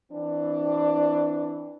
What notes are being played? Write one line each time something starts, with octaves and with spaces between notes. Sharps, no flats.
E3 C4 D4